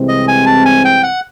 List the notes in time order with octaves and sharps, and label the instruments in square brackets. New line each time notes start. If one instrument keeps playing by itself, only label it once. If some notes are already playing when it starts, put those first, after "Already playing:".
Already playing: [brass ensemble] C2 C3 E3 G#3 C4
[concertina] D#5
G#5
A5
G#5
G5
F#5